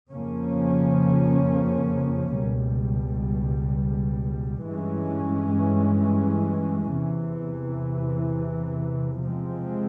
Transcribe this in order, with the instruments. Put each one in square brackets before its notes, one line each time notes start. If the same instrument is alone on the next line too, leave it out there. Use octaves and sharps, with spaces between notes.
[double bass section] F2 C#3 F3 A#3 C#4
C#2 B2 G3
G2 E3 G#3 C#4
E2 C3 E3
C3 F3 G#3 C4